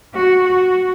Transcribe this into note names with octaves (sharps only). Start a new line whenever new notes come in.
F#4
F#4